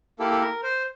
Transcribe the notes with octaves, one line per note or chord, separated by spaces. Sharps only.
A#3 E4 G4 A4
A4
A#4
C5